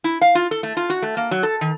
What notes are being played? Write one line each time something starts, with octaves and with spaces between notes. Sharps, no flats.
E4
F5
F4
A4
A3
F4
F#4
A3
A#3
F#3
A4
D#3